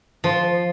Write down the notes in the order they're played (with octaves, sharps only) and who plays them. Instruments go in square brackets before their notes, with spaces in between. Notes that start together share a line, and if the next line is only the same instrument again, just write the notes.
[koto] F3